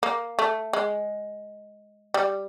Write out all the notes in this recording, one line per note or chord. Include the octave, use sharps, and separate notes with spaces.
A#3
A3
G#3
G3